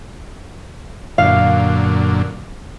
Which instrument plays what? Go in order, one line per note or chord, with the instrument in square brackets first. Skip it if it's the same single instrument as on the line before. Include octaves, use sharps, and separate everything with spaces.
[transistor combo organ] F#2 A#2 D3 [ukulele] F5